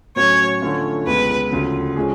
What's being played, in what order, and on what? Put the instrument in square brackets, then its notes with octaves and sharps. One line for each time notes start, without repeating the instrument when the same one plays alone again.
[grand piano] A2 F#3 C#4 F#4 [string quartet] C#5
[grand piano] D3 F3 A3 C#4 F4
[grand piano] C#2 B2 G#3 [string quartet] B4
[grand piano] D2 C#3 F3
F3 G#3 C#4 G#4